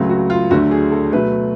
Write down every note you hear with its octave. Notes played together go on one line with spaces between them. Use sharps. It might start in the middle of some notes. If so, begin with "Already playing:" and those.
Already playing: C#2 C#3 F#3 A3
F#4
F4
D2 D3 F#3 A3 F#4
G#4
A4
B2 F#3 A3 B4